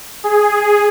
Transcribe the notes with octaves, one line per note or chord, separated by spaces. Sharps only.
G#4